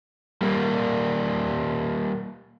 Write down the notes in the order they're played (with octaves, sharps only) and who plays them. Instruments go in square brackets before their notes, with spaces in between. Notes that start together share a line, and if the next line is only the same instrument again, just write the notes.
[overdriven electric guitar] G3 A#3